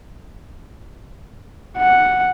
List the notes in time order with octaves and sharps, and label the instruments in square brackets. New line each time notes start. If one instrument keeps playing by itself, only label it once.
[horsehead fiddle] F#5